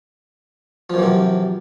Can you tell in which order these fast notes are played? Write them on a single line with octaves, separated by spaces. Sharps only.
F3 F#2 E3 C3